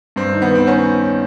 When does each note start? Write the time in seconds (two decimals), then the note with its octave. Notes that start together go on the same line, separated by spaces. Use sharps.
0.16 G2 C4
0.33 D#3
0.42 B3
0.50 D#3 C4
0.67 B3 C#4